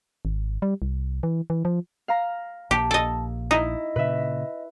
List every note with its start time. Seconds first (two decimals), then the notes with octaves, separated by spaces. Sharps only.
0.25 G#1
0.62 G3
0.82 C2
1.23 E3
1.50 E3
1.65 F3
2.08 F5 A#5
2.71 A#1 A#3 G4 A5
2.91 A4 D#5
3.51 D#4 E4 D#5
3.96 A#2 C#3 B4 E5